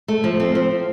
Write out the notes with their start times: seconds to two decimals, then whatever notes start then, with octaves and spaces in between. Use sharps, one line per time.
0.08 A3
0.24 F3
0.40 C4
0.55 F3